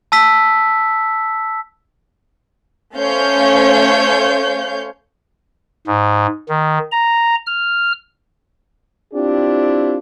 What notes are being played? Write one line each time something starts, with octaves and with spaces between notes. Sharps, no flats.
A5 E6 B6
A3 C#4 C5 C#5 F5 G6
G#2
D#3
A#5
F6
C4 D4 E4 F4 G4